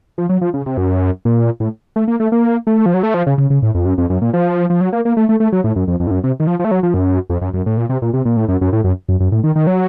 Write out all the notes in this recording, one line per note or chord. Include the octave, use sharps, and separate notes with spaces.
F3
F#3
F3
C#3
C3
F#2
A#2
A2
A3
A#3
A3
A#3
A3
F3
F#3
A3
F3
C#3
C#3
C#3
A2
F2
F#2
F2
F#2
A#2
F3
F3
F#3
A#3
A#3
A3
A3
A3
F#3
A2
F#2
F2
F2
A2
F#2
C3
D#3
F3
F3
A3
F#3
F3
F#2
F2
F#2
F#2
A2
A#2
C3
A#2
C3
A#2
A2
F#2
F#2
A2
F#2
F#2
F#2
A2
D#3
D#3
F#3